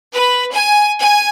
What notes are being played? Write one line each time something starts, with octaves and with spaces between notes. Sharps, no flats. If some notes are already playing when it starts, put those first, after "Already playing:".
B4
G#5
G#5